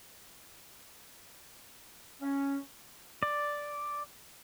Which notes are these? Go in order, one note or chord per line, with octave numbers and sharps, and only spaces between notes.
C#4
D5